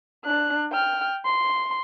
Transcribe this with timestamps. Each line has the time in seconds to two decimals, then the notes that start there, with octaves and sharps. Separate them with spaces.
0.25 D4 F#6
0.72 G5 F6
1.25 C6